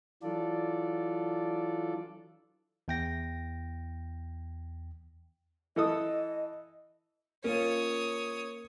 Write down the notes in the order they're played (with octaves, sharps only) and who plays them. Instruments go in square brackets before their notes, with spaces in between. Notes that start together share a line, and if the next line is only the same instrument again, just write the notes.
[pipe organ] E3 F#3 D4 F4 A4 D5
[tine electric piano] E2 G5 A#6
[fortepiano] E3 A4 D#6 [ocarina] D#5
[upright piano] A#3 [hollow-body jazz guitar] C#4 F4 [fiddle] C#5 D#6